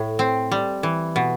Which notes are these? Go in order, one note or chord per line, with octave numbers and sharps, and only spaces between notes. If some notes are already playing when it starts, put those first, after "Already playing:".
Already playing: A2
C4
G3
E3
B2